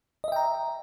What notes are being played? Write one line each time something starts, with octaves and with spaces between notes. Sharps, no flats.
D#5 E5 G5 A#5